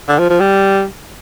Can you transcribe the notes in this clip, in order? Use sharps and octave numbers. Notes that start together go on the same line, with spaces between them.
D3
F3
F3
G3